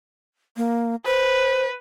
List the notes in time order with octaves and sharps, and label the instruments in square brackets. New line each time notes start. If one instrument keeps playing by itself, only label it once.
[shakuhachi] A#3
[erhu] B4 [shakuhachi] C5